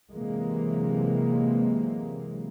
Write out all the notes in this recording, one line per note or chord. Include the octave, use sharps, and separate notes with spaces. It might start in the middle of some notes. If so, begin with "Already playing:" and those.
C3 E3 F#3 G#3 A#3